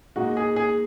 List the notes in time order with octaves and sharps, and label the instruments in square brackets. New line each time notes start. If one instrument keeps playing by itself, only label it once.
[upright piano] A#2 G#3 D#4 [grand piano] F#4
[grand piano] G#4
G#4